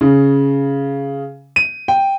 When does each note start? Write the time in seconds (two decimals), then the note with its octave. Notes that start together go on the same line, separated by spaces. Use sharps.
0.01 C#3
1.56 D#7
1.88 G5